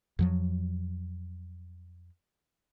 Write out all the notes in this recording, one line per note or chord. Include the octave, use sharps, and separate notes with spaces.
F2 F3 F#3